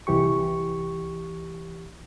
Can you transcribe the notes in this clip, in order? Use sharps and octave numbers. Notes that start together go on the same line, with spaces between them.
C2 E3 G4 C#6